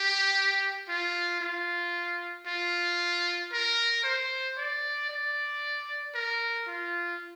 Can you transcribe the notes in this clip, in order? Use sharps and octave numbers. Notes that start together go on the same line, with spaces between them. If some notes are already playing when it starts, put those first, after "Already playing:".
Already playing: G4
F4
F4
F4
A#4
C5
D5
D5
A#4
F4